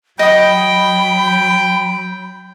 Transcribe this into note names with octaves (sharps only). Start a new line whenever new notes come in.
F#3 D#5 F#5 G5 B5 D#6